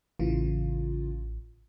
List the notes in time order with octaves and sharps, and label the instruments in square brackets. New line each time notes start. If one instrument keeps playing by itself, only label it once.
[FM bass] A1 [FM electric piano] C#3 E3 F4